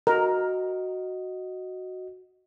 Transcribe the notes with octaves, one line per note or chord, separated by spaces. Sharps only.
F#4 A#4 D#5